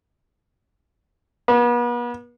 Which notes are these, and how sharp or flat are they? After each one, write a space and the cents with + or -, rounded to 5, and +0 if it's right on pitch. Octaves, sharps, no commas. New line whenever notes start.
B3 -40